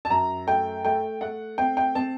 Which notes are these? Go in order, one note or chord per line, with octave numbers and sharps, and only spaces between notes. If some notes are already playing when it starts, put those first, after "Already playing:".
A5
F#2 A#5
A3 G5
A3 G5
A3 F#5
C4 G5
G5
C4 A5